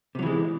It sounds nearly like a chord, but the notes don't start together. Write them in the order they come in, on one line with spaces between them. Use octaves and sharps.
C3 F#3 E3 G#3